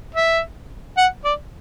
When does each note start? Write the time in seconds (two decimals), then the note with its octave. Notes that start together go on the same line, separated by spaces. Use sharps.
0.14 E5
0.97 F#5
1.25 D5